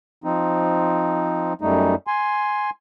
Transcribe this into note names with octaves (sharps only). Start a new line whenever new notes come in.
F3 C4 D#4
F#2 G3 A3 D#4
G#5 C6